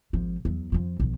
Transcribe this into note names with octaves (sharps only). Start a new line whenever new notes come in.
G#1 F3
E2 F#3
F2 F3
B1 F3